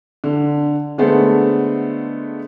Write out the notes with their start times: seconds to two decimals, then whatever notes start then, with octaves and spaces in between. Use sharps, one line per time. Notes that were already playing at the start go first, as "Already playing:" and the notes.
0.24 D3
0.98 D3 G#3 A3 B3 C5